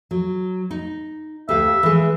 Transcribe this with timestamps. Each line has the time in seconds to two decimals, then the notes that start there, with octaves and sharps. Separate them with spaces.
0.11 F#3
0.71 D#4
1.49 D2 G4 E5 F5
1.83 E3 G#3